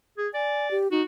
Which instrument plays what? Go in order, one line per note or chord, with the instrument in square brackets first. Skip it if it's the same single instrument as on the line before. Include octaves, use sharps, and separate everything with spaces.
[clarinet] G#4
[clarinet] D5 [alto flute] G#5
[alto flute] G4
[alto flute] D#4 [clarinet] F#4